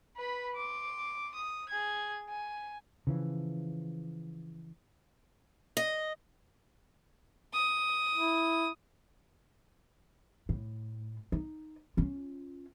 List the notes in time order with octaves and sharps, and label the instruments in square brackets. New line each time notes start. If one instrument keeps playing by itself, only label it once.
[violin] B4 B5
C6 D6
D#6
G#4 G#6
G#5
[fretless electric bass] C#3 E3 F3
[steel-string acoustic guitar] D#5
[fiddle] D#6
[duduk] E4
[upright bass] A2
D#4
C#4 F4